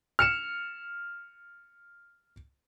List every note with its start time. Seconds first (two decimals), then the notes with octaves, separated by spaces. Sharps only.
0.19 F6 C#7 E7